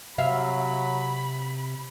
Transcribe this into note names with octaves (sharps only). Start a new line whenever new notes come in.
C3 F#3 E5 F5 B5